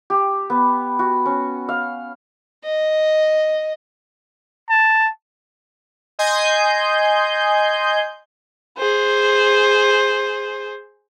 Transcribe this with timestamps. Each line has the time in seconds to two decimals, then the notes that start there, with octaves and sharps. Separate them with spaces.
0.10 G4
0.50 B3
0.99 F#4
1.26 C#4
1.69 F5
2.64 D#5
4.70 A5
6.19 D#5 G#5 C6 G6
8.78 G#4 C5